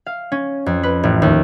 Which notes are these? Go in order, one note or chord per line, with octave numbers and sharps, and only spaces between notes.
F5
C#4
F2
B4
A1
D#2